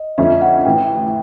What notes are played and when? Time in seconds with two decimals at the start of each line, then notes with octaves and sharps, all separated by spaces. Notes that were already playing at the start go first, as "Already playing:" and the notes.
Already playing: D#5
0.18 F2 D3 F3 A3 C#4 E5
0.41 F#5
0.65 A1 A2 E3 G5